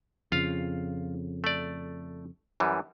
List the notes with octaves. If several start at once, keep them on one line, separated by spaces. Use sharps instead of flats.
F2 C#3 F4 F5
A3 D5
F#2 E3 G3